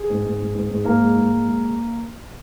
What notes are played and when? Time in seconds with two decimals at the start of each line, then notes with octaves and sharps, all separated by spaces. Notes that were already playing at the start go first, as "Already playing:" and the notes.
Already playing: G#4
0.10 G#2
0.25 G#2
0.40 G#2
0.55 G#2
0.70 G#2
0.85 G#2 A#3 A#4
1.00 G#3
1.15 G#2
1.30 G#3
1.45 G#3